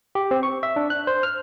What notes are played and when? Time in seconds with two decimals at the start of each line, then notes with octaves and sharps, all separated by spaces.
0.15 G4
0.31 C4
0.43 C#6
0.63 E5
0.76 D4
0.90 F#6
1.07 C5
1.23 F6